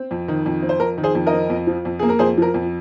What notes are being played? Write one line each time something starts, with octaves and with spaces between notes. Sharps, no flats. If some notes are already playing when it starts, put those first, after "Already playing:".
Already playing: C4
F2
D#3
F2
C4
C5
F2 A#4
D#3
G#4 C5
F2
A#4 D#5
C4
F2
F3
F2
A#3 G#4
A#4
F2 G#4 C5
F3 A#4
F2